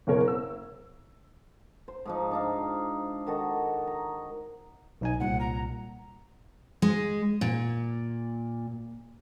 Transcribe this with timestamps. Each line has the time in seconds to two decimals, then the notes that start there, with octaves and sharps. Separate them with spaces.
0.07 F#1 B2 A#4 C#5
0.28 E6
1.88 C5
2.05 G#2 F3 D#4
2.31 D4 D#4 F5
3.27 D#3 F#4 A4 D#5
3.87 A#5
5.01 B1 D#4 G#5
5.20 C2 A#2 F#5
5.40 A#5
6.82 G#3
7.41 A#2